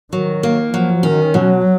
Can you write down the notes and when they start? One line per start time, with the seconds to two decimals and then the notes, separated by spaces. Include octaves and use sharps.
0.13 D#3 F#3
0.43 A#3
0.73 F3 F#3
1.03 D#3 C#4
1.34 B2 F#3